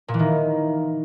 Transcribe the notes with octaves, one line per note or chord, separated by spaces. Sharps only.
A#2
E3
D#3